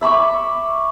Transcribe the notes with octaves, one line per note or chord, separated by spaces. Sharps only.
E5 B5 C#6 D6